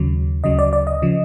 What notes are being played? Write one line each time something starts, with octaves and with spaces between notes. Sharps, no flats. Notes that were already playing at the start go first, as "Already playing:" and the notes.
Already playing: D#2 C#3 F#3
D2 C#3 F#3 D#5
D5
D5
D#5
C#3 F3